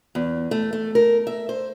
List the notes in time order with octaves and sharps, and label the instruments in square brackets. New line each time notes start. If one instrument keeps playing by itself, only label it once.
[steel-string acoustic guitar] E2
A3
A3
A#4
E5
C5